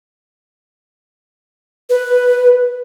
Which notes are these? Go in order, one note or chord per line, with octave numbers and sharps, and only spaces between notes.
B4